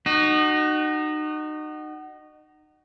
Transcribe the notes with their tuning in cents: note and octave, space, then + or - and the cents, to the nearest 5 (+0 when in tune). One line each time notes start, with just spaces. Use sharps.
D#4 -30 F#4 +20